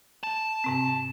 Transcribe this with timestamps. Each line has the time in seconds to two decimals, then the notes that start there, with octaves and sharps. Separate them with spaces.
0.23 A5
0.64 G#2 C3 C4